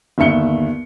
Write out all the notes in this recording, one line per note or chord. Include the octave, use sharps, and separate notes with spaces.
G1 D#2 E5 C#7 G7